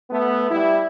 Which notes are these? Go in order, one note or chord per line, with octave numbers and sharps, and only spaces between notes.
A3 B3
G3 E4